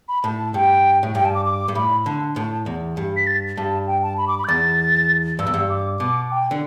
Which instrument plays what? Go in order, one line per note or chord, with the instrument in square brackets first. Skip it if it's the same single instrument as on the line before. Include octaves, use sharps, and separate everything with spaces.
[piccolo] B5
[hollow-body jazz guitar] A2 [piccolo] A5
[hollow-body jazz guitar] G2 [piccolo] G5
[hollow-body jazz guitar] A2
[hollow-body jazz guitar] G2 [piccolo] G5
[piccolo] A5
D6
D6
[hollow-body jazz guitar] G2
[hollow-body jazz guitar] A2 [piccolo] B5
[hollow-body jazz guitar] D3 [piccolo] A5
[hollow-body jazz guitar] A2 [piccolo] A5
[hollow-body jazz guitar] E2
G2
[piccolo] B6
A6
[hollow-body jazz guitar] G2 [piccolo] A5
[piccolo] G5
A5
B5
D6
B5
G6
[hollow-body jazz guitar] E2 [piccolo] A6
[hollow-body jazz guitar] G2 [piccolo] E6
[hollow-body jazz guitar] E2
G2
[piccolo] D6
[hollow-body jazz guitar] B2 [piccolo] D6
[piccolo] G5
[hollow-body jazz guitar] D3